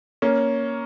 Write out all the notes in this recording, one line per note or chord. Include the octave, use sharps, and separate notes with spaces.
A#3 C#4